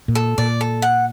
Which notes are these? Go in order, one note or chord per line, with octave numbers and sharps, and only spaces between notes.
A#2
A4
A#2 D5
A4
F#5